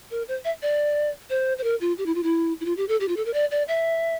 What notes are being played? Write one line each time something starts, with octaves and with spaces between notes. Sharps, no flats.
A#4
C5
E5
D5
C5
C5
A#4
F4
G4
E4
F4
E4
E4
F4
G4
A4
G4
F4
A4
A#4
D5
D5
E5